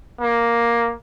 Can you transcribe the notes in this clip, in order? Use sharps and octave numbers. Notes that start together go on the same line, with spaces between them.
A#3